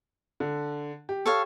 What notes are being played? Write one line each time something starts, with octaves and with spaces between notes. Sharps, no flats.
D3
G4
A4 C#5 F5